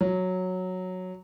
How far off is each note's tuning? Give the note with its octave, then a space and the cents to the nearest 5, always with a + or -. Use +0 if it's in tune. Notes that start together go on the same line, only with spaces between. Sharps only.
F#3 -5